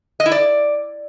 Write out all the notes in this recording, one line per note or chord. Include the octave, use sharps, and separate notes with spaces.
D#5
E4
D5